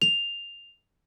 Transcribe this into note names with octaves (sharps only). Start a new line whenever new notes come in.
F7